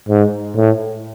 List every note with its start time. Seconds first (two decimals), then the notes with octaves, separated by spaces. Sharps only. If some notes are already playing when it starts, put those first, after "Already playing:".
0.09 G#2
0.56 A2